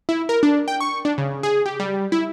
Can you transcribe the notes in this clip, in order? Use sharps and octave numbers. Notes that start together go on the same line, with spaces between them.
E4
A#4
D4
G5
C#6
D4
C#3
G#4
G4
G3
E4